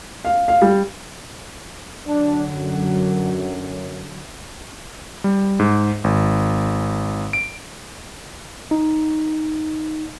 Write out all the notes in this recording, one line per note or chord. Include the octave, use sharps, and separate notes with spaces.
F5
F5
G3
D3 F#3 D4
F#2
G3
G#2
G#1
D7
D#4